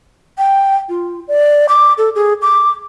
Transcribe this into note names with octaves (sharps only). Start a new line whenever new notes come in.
G5
F4
D5
D6
A4
G#4
D6